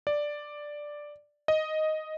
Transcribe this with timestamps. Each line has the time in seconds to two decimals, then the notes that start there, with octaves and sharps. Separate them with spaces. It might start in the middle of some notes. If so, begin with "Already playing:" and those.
0.07 D5
1.48 D#5